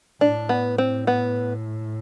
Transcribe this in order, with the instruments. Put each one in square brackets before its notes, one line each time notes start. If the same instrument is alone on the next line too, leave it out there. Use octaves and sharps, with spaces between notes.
[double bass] A2 [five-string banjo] D4
[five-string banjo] B3
C4
B3